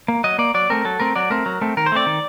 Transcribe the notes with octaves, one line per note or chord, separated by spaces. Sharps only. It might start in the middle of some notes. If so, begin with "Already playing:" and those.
A#3
F#3 D#5
A#3 D5
F#3 D5
A3 C4 A#4
F#3 A4
A3 C4 A#4
F#3 D5
A3 C4 A#4
F#3
A3 C4
D#3 A#4
C5
A3 C4 D5
D#3